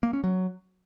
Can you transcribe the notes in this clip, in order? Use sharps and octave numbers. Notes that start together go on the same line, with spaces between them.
A#3
C#4
F#3